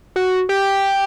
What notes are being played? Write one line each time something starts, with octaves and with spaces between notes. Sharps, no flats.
F#4
G4